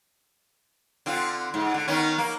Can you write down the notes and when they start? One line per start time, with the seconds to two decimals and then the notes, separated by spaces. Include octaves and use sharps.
1.06 D3 C4 F4
1.54 G#2
1.74 D3
1.88 D#3 B3 C#4
2.18 A#3